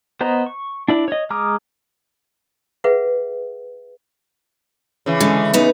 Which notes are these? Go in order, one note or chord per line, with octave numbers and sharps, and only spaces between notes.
B3 C5 D#5 A#5
C#6
D4 E4 D5
C#5 D#5
G#3 A#5 D6 D#6 F6
G#4 B4 E5 F#5
C#3 E3
D3 G#3
B3 D#4